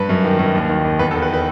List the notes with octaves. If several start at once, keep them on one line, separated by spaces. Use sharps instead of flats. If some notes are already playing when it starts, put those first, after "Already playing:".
Already playing: G2 B4
F#2
D#3
F#2
D#2
D#3
D#2
E2 B4
A4
D#3
B4
B4